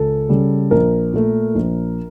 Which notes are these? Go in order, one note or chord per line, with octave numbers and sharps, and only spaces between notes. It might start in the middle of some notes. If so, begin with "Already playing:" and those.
Already playing: C#2 A4
C#3 G3
A#1 A#4
A#2 A3
A#1